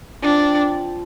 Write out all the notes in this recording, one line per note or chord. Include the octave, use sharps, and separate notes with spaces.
F3 C4 D4 F4